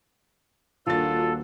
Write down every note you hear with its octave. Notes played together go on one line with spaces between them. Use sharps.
D#1 A#3 D4 F4 F#4 A4 A6